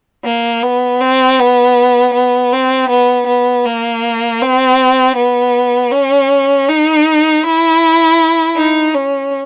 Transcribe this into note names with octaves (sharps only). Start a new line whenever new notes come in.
A#3
B3
C4
B3
B3
C4
B3
B3
A#3
C4
B3
C#4
D#4
E4
D#4
C#4